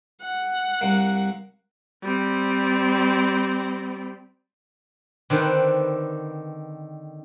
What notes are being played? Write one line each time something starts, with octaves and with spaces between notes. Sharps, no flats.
F#5
C2 A#3
G3 C4
D3 D#3 C4 D4 B4